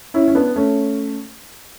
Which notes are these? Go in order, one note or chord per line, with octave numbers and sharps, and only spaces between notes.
C#4 E4
C#4
B3 D4
A3 C#4